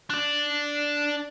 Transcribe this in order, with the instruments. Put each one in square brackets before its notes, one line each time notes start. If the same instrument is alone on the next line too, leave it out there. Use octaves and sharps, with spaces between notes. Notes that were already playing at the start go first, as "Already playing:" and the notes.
[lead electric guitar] D4 D5